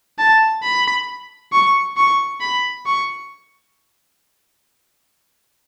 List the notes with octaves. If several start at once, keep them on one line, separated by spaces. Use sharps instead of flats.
A5
B5
C#6
C#6
B5
C#6